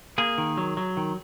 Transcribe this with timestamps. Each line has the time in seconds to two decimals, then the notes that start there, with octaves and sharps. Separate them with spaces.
0.18 A#3 G#4
0.38 D#3
0.58 F#3
0.77 F#3
0.97 D#3